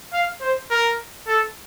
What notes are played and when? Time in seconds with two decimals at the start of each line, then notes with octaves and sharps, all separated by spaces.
0.13 F5
0.41 C5
0.71 A#4
1.28 A4